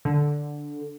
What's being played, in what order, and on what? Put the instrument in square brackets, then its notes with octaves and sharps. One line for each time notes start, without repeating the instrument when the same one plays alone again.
[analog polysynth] D3